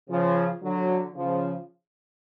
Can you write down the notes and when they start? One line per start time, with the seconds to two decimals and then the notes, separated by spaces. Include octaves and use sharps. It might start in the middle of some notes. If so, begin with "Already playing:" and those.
0.10 C#3 F3
0.63 D3 F#3
1.15 C#3 F3